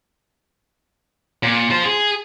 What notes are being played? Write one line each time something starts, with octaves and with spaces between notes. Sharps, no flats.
A#2
F4 C5
G#4